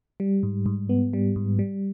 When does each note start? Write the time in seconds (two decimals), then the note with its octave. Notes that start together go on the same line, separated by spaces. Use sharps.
0.20 G3
0.43 G#2
0.66 G#2
0.89 B3
1.13 G3
1.36 G#2
1.59 G3